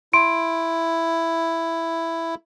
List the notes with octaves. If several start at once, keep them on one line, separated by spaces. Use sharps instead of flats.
E4 C6 D7